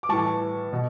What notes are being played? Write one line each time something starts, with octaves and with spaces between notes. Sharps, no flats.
D6
A2 E3 G3 A5 C#6
B2